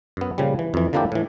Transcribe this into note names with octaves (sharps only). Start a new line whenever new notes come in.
F#2 B3
A#2 C#3 F3 G3
E3
F2 E3
D3 F3 A#3 D4 E4 G4
A2 E3